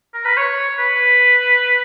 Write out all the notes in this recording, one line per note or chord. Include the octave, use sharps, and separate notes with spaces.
A#4
B4
C#5
B4